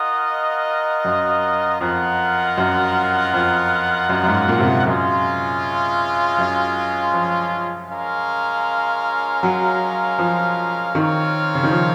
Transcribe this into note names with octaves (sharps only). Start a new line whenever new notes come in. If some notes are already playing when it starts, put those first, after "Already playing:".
Already playing: F4 A#4 D#5 F#5
F#2
F2 F4 A#4 D#5 F#5
F#2
F2
F#2
F#2
G#2
A#2
C3
A#2
F#2 G#3 C#4 F4
F#2
F3
G#3 C#4 F4 A#4 F5
F#3
F3
D#3 C4 F4 A#4 C#5 F5
C#3
D#3
F3